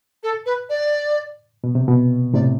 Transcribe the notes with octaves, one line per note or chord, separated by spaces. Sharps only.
A4
B4
D5
B2
C3
B2
A2 C3 D5